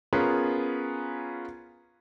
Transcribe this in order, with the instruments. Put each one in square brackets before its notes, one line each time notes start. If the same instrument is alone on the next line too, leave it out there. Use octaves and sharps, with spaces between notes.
[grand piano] B3 C#4 F4 G#4 A#4 B4